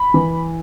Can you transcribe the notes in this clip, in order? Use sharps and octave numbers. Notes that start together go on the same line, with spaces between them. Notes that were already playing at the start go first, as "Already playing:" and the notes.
Already playing: B5
E3